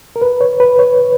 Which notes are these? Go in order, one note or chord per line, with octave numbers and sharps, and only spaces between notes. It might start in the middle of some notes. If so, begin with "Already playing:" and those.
A#4
B4
C#5
B4
C#5